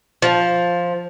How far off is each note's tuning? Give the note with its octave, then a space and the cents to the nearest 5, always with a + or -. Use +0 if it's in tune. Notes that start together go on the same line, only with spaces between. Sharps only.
F3 +5